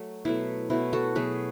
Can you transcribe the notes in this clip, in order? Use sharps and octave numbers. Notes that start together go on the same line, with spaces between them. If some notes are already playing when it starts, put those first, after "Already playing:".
Already playing: F#3 A3
B2 F#3 A3 E4
B2 F#3 A3 E4
F#4 A4
B2 F#3 A3 G#4 B4